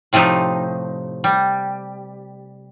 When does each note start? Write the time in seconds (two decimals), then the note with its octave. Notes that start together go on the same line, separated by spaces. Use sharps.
0.13 A2 C3 F3 A3 D#4
1.24 G3